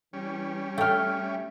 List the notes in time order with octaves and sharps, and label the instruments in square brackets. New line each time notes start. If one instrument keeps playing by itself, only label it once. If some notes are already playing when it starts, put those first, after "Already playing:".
[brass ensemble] E3 [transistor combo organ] G3 C#4
[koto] A3 C#5 [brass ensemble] E5 [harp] G5 F6